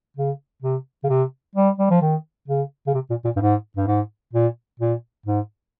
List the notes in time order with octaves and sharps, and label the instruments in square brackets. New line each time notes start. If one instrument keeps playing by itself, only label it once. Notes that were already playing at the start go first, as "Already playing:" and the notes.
[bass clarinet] C#3
C3
C#3
C3
G3
G3
F3
D#3
C#3
C#3
C3
A#2
A#2
G2
G#2
G2
G#2
A#2
A#2
G#2